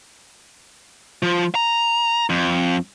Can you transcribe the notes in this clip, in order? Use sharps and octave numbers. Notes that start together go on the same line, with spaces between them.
F3
A#5
F2